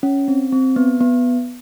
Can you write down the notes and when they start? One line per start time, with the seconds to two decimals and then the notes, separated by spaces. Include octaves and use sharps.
0.03 C#4
0.28 C4
0.52 C4
0.76 B3
1.01 B3